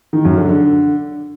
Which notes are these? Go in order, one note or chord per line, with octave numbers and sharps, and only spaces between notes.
D#3
F#2
D3
D3